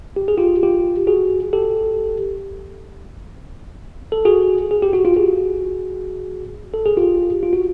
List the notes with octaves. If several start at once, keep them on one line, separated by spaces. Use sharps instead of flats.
G4
G#4
F4 G4
F4 G4
F#4 G#4
G4 A4
A4
F#4 G#4
G#4
G4
F#4
F4 G4
F#4 G#4
A4
G#4
F4 G4
F4
F#4